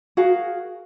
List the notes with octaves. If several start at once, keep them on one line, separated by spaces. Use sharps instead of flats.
F#4 G#4 A#4 F5